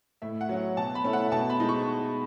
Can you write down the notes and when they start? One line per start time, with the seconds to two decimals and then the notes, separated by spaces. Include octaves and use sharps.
0.22 A2 E5
0.41 F#5
0.49 F#3 C#4
0.77 B2 A5
0.95 B5
1.04 A3 C#4 E4
1.13 F#5
1.32 B2 A5
1.50 B5
1.60 G#3 D#4
1.69 C#6